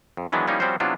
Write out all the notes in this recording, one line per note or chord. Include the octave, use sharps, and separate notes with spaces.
F2
D#3 E3 F#3 G#3 B3 D4
F3 G3 A#3 C#4 D#4 E4
F3 G3 C4 C#4 F#4 C5
C3 F#3 B3 D4 E4 F4